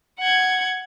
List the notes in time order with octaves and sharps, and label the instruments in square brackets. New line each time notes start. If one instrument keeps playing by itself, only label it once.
[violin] F#5 G#6